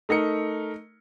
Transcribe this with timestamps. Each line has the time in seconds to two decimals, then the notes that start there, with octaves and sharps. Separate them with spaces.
0.09 A3 D#4 A#4 C#7